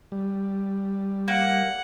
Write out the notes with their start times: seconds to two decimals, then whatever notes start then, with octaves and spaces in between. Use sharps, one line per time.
0.12 G3
1.28 A#3 F#5